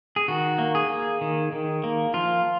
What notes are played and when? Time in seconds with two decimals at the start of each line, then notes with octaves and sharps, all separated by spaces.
0.16 G#4
0.28 D#3 F#4
0.58 A#3
0.75 G#4
0.89 A#3
1.21 D#3
1.52 D#3
1.84 A#3
2.14 F3 F4